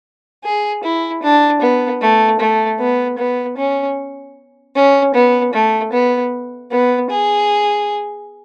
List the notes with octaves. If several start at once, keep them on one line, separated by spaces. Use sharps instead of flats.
G#4
E4
D4
B3
A3
A3
B3
B3
C#4
C#4
B3
A3
B3
B3
G#4